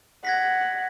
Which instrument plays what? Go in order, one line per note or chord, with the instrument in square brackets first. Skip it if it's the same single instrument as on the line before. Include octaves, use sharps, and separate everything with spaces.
[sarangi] F#5 [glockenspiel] G#6 A#6 B6